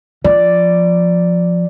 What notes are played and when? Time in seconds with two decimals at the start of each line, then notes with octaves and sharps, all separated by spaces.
0.25 F3 D5